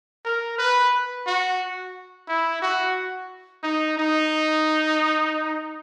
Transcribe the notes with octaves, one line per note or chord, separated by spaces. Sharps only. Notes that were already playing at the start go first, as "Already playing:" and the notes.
A#4
B4
F#4
E4
F#4
D#4
D#4